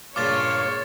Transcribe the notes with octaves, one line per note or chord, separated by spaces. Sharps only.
C#2 G2 A#2 F4 C#5 D6 A6